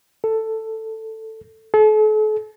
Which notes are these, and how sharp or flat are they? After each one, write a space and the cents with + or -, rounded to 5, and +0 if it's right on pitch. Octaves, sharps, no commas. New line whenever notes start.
A4 +10
A4 -40